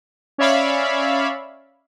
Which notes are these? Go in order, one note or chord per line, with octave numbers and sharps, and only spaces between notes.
C#4 C#5 D5 E5 F5 B5